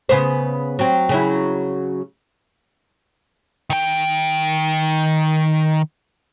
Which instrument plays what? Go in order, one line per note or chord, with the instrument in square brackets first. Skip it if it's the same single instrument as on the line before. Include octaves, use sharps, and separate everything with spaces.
[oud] C#3 B3 C5
F#3 C4
C#3 F#3 E4
[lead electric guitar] D#3 G5